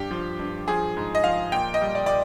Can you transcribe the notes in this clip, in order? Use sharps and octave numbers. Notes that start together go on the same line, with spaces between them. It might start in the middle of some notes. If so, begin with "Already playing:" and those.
Already playing: G2 G4
F3
G2
F3 G#4
G#2
D#5
F3 F5
A#2 G5
D#5
G3
D5
A#2 D5